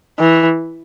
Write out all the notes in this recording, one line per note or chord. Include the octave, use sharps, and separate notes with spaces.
E3